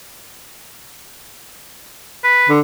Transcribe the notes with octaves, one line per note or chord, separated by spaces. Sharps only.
B4
D3